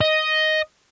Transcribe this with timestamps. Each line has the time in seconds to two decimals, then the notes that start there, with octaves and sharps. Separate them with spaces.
0.01 D#5